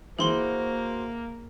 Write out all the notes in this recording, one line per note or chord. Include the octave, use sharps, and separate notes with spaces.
E3 A#3 F#4 G#4 C5 C6 G7